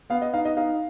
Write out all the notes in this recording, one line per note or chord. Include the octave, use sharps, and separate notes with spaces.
B3 F5
D#5
D#4 F5
D#5
D#4 F5